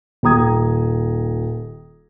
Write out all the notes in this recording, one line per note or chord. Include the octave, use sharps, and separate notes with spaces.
D#1 G5 A#5 D#6 G#6